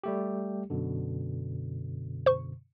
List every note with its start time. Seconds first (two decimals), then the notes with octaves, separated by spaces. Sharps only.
0.04 G3 A3 G4
0.70 F#2 B2 D3
2.26 C5 C#6